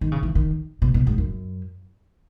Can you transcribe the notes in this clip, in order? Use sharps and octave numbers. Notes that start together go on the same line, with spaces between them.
D#3
C#3
E3
D#3
B2
B2
G#2
F#2